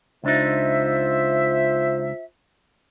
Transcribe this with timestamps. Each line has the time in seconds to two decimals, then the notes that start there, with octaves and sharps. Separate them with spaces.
0.24 C#2 D4 D#4 F4 C5 E5